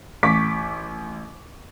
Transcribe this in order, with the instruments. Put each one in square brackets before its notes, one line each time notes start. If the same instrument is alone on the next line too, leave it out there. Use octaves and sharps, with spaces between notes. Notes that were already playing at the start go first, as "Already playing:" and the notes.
[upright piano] A1 [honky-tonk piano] C#6 D6 B6